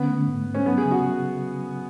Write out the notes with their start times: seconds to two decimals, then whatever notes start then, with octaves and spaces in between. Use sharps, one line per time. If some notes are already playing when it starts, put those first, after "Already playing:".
Already playing: D3 B3 C#4
0.08 A3
0.27 G#2
0.46 G#2
0.55 C#4
0.65 F#3 B3
0.78 G#4
0.84 C#3
0.91 F#4